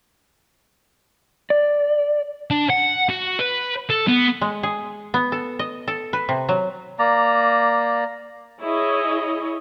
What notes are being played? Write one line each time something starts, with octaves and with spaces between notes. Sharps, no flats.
D5
D4
F#5
F#4
B4
A4
B3
G#3
G#4
B3
A4
D#5
A4
B4
C3
F#3
A#3 D5 A#5
E4 G#4 C#5 D#5